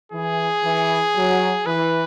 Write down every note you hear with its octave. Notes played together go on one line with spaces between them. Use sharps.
E3 G#4
E3
F#3
E3 B4